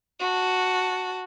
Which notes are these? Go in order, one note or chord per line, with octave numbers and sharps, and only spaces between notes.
F#4 A5